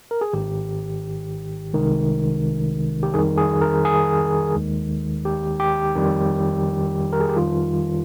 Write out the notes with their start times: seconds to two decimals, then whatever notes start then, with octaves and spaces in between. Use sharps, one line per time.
0.11 A#4
0.21 G#4
0.33 G#1 G#2 D#3 G4
1.73 C2 C3 D#3 G#3
3.03 G4
3.14 F2 D#3 G3 G#4
3.38 G#4
3.61 A#4
3.85 G#4
4.54 D#2 D#3 G#3
5.25 G4
5.60 G4
5.96 F2 D#3 G3
7.13 A#4
7.21 G#4
7.29 G4
7.36 F2 D#3 G3 F4